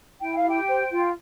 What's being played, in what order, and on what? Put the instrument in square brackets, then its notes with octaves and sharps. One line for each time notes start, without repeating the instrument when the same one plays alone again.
[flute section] E4 G5
F5
G4 G5
C5
F4